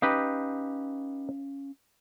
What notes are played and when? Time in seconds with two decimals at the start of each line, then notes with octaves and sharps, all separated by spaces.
0.02 C#4 D#4 G4 B4 F5